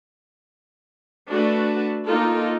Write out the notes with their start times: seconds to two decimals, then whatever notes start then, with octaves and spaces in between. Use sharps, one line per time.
1.29 A3 D4 F#4 B4
2.06 A#3 D#4 F4 A4